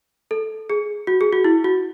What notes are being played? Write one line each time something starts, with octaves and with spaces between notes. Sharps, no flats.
A4
G#4
F#4
G#4
F#4
E4
F#4